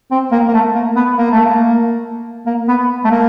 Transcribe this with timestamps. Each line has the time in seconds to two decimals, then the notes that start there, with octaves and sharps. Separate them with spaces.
0.11 C4
0.32 A#3
0.48 A#3
0.54 A3
0.75 A#3
0.96 B3
1.18 A#3
1.31 A3
1.45 A#3
2.46 A#3
2.68 B3
3.04 A3
3.11 A#3